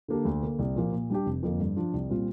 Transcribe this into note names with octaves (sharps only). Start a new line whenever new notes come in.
D3 A#3 D4 G4
D2
D3 A#3
C2
A#2 F3 A#3
A#2
G3 D4 G4
F1
F2 D3 F3 A#3
G2
F3 D4 F4
C2
A#2 G3 C4 F4